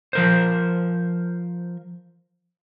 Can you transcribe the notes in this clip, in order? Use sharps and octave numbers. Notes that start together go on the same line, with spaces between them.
F3 A#4 C5